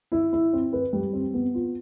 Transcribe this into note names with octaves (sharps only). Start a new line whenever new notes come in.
E4
E4
C4
B4
G3
C4
B3
F4